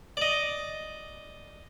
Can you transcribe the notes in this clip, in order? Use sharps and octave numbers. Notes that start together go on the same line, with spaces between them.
D5 D#5